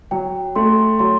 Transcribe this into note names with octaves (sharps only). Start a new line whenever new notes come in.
F#3 G5
A3 C6
F#3 C6